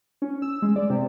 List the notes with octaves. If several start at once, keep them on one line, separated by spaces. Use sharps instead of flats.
C#4
E6
G#3
D5
C3